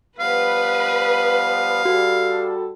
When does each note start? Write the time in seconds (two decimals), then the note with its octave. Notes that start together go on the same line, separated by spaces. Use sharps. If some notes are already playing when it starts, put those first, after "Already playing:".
0.20 F3 G3 B3 B4 F5
1.85 G3 F#4 A4